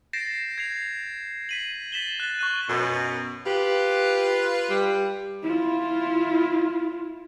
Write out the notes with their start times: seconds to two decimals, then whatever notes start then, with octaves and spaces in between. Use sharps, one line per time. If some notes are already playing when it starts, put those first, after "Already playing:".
0.13 G6 A6 A#6 C7 D7 E7
0.58 G#6 C7 F7
1.49 B6 D#7 F#7
1.92 A6 B6 E7 G7
2.20 F#6 A6
2.39 C#6 F#6 D#7
2.69 F#2 B2
3.46 F4 G4 B4
4.70 G3
5.43 E4 F4